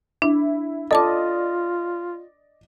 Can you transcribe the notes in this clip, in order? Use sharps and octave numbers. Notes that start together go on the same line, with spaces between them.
D4 E4
F4 A4 D5 D#5 A5 D6